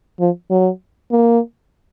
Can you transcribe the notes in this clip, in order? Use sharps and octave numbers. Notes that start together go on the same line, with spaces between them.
F3
F#3
A#3